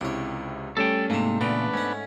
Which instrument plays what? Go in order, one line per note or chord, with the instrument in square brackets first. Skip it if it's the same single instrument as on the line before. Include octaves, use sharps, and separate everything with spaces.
[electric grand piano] C#2 C3 E4 [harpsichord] D4 C#5
[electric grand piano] G3 A3 C#4 [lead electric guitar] A4 G5
[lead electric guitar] G#2 C3 [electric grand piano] A3 [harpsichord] A#3 D4
[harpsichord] E2 G5 [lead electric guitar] A#2 C#3 [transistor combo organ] B3 D4 B4
[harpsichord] G#2 F#5 [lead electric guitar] C#4